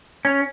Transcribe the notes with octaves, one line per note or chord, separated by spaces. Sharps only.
C#4